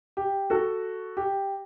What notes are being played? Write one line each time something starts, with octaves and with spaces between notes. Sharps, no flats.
G4
F#4 A4
G4